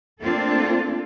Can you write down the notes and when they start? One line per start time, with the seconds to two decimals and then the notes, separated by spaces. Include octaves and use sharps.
0.22 A3 A#3 C4 D4 F4 A4